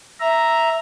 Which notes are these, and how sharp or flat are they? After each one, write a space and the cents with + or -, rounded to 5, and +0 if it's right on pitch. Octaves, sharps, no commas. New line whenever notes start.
E5 +0 A#5 +0